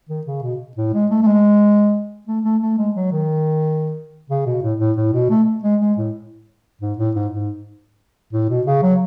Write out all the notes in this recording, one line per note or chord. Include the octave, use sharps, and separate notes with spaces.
D#3
C#3
B2
A2
G#3
A3
A3
G#3
A3
A3
A3
G#3
F#3
D#3
C#3
B2
A2
A2
A2
B2
A3
G#3
G#3
A2
G#2
A2
G#2
G#2
A2
B2
C#3
F#3